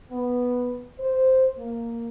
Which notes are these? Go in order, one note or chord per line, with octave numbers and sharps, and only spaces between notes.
B3
C5
A#3